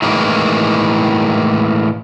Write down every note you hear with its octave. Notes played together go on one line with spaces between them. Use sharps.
A2 D#3 E3 G#3 A#3